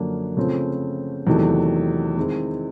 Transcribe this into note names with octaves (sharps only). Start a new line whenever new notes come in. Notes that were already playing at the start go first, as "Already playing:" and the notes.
Already playing: F#2 D3 F3 A#3
C#3 F3 A3 C4
E2 C3 D#3 F#3 A3
D#3 G#3 C4 E4